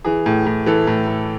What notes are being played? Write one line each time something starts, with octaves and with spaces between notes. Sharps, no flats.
E3 G#4
A2
A2
E3 A4
A2
A2